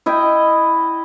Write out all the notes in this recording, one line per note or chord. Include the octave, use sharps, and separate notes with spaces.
E4 D#5 G5